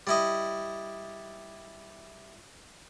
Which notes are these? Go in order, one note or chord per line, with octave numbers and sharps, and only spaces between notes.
G3 E4 D#5